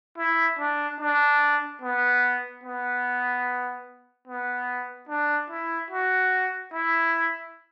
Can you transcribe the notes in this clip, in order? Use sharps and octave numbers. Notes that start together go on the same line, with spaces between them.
E4
D4
D4
B3
B3
B3
D4
E4
F#4
E4